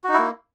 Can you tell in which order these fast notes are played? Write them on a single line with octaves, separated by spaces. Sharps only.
F#4 D#4 E4 A#3